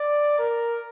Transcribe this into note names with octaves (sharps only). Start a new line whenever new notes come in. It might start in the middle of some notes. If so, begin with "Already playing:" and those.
Already playing: D5
A#4